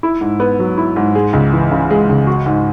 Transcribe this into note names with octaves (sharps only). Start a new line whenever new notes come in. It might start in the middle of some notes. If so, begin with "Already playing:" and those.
E4
G#2
B3
F#3
E4
G#2
G#3
C#2
E3
C#3
G#3
C#2
F#4
G#2